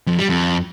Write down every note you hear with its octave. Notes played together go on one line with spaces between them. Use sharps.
F2
G3
F2